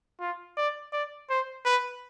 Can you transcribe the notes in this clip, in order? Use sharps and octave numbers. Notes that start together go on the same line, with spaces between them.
F4
D5
D5
C5
B4